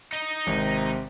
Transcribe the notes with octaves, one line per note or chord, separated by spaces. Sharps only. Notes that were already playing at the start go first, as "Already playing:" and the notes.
D#4 D#5
G#1 C3